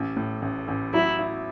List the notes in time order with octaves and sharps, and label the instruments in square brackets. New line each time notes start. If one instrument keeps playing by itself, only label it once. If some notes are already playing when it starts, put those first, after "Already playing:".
Already playing: [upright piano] A1
A2
A1
A1
[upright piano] F#3 [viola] E4
[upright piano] E4